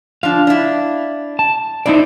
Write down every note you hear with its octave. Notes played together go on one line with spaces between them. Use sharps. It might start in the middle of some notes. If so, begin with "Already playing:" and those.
F3 D4 F5
D4 E4
A5
C4 D#4 E4 D5